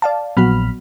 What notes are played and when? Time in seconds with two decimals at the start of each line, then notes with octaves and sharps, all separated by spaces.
0.02 D5 F5 A5
0.37 A#1 F#3 B3 F#4 B5 F6